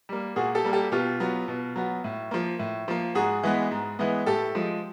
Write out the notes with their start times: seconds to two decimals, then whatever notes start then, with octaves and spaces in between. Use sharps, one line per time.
0.09 G3 A#3
0.36 A#2 F#4 G#4
0.55 G4 A4
0.64 G3 A#3
0.73 G4 A4
0.92 B2 F4 G4
1.20 F#3 B3
1.48 B2
1.76 F#3 B3
2.04 A2
2.31 F3 A#3
2.59 A2
2.88 F3 A#3
3.15 G#2 F#4 G#4
3.43 E3 G#3 B3
3.71 G#2
3.99 E3 G#3 B3
4.26 A2 G4 A4
4.55 F3 G#3